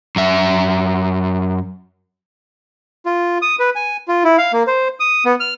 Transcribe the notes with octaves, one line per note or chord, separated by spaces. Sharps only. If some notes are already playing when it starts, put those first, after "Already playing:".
F#2 E5
F4
D#6
B4
G#5
F4
E4
F5
A#3
C5
D#6
B3
F6